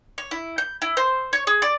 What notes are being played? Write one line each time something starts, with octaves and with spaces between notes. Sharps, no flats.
C#5
E4
G6
E4
C5
C#5
G#4
D5